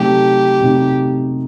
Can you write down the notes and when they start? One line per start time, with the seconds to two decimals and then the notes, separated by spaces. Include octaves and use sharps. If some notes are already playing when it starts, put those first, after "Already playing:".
Already playing: C3 F#3 A3 D#4 G4
0.61 C3 F#3 A3 D#4